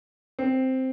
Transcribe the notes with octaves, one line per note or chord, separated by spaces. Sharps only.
C4